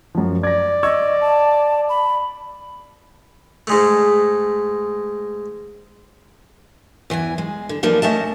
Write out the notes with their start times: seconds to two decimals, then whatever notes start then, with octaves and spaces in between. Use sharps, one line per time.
0.15 F#2 F3
0.43 D5 G#6 A#6
0.83 D#5 C#6 E6 G#6
1.21 A5
1.89 B5
3.67 G#2 G#3 A3
7.10 E2 E3 D5 G#5
7.38 G#3
7.69 D3
7.83 E3 F3 A#3 D4 D#4
8.02 A3 C#4 D#5 A5